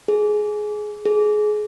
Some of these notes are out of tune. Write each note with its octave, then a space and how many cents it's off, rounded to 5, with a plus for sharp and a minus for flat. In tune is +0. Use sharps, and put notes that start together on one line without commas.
G#4 +20
G#4 +25